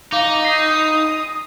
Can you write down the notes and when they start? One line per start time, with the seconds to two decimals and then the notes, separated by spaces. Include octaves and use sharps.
0.12 D#4 F5 D6
0.44 D#6 A#6 C7